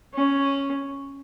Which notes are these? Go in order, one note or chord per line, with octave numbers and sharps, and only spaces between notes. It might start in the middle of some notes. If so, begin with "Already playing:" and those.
C#4